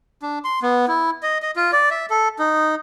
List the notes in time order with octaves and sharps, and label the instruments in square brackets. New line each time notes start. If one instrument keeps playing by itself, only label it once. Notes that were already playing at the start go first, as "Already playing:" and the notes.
[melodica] D4
C6
B3
E4
D#5
D#5
F4
D5
E5
A4
D#4